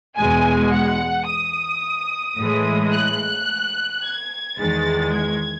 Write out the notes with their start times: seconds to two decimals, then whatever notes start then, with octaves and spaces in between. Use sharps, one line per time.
0.16 E2 B2 G#3 G#5
0.72 F#5
1.27 D#6
2.37 A2 E3 G#3
2.93 F#6
4.03 G#6
4.57 E2 D#3 G#3 A6
5.12 G#6